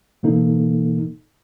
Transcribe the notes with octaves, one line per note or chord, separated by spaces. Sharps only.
B2 E3 A#3 D#4 A4